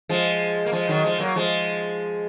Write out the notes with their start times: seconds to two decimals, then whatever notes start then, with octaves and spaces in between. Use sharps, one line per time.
0.09 F3 G#3
0.66 A#3
0.73 F3 G#3
0.89 D#3 F#3
1.03 F3 G#3
1.19 F#3 A#3
1.36 F3 G#3